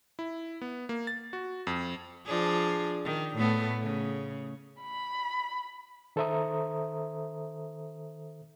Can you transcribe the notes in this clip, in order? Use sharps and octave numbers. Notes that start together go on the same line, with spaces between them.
E4
B3
A#3
A6
F#4
F2
F3 D4 G#4
D#3
A2 A3 B3
C#3
B5
D#3 A4 C5 E5 A#5 D#6